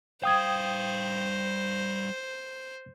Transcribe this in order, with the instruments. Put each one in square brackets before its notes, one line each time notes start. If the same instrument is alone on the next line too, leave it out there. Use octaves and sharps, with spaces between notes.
[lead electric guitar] G3 F5 [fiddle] C5 [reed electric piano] G5 D#6 G#6